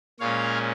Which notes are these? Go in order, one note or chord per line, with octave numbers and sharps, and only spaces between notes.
A#2 G#3 C#4 C#5 F5